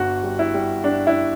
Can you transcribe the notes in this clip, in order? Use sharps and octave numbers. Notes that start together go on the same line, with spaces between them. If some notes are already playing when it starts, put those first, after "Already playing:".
Already playing: G1 F#4
G3
E4
G3
G3 D4
E4